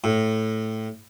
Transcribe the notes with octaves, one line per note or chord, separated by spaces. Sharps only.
A2